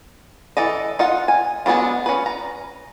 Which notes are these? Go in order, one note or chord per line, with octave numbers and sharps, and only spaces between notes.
E3 A4 D#5
D#4 F4 F#5
G#5
F#3 G#3 B3 D4 F4
C#4 B4
A#5